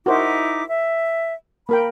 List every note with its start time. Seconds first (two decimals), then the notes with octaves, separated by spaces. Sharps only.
0.06 D#4 E4 F#4 A#4 C5 D6
0.68 E5
1.69 A#3 A#4 G5 B5